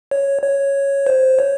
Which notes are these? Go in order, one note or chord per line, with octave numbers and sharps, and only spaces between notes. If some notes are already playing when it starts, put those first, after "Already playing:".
C#5
C#5
C5
C#5